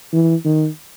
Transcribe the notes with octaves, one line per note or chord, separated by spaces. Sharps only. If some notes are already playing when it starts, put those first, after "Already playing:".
E3
D#3